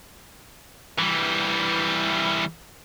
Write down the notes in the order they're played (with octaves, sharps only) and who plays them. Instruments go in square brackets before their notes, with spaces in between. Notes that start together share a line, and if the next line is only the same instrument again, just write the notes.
[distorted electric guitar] E3 G3